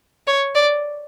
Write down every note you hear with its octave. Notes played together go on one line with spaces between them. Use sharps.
C#5
D5